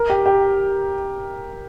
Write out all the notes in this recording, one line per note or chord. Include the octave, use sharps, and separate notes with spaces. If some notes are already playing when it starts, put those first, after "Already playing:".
Already playing: A#4
G4
G4